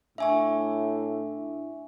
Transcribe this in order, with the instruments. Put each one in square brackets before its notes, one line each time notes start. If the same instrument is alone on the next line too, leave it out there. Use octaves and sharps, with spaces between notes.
[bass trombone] A2 [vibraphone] D4 E4 [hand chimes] E5 G#5 C#6